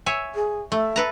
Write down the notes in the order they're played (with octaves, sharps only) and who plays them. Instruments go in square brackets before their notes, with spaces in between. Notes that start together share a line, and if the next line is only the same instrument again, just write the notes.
[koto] C#5 E5 G#5
[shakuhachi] G#4
[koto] A3 [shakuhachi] E5
[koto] A4 B4 A#5